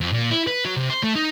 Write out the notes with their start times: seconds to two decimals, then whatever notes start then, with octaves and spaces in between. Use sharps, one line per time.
0.01 F2
0.13 A#2
0.31 E4
0.47 B4
0.65 F#3
0.77 C3
0.90 C5
1.03 A3
1.16 D#4